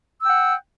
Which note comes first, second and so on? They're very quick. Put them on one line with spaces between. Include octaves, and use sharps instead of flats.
E6 G5 F#5